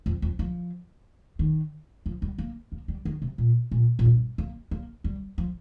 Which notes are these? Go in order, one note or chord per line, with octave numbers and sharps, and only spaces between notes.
F2
F2
F3
D#3
F3
G3
A#3
A#3
G3
D#3
C3
A#2
A#2
A#2
G2
A#3
A#3
G3
F3